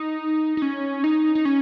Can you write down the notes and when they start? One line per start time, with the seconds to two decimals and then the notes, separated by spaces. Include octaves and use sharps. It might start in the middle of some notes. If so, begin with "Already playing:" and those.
Already playing: D#4
0.57 D#4
0.62 C#4
1.04 D#4
1.35 D#4
1.45 C#4